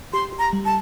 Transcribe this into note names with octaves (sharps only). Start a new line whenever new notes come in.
G4 C6
G4
A#5
G3
A5